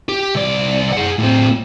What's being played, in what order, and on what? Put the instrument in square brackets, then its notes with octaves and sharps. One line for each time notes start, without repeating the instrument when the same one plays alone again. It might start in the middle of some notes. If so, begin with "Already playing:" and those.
[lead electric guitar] G4
C2 D5
G#4 F#5
A2 C4